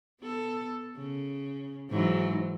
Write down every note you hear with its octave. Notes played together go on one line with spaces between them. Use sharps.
B3 A4
C#3
G#2 E3 F#3